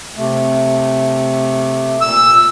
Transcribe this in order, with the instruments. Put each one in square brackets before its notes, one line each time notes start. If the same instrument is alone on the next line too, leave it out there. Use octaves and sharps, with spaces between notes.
[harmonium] C3 A3
[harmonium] A#2 [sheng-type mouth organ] E6